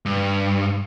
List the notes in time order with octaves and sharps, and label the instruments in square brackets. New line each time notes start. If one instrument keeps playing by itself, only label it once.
[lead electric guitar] G2